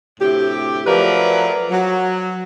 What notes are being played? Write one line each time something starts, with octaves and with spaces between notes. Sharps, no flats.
D2 A2 C3 G4
F3 F#3 A3 A#4 B4 D5
F#3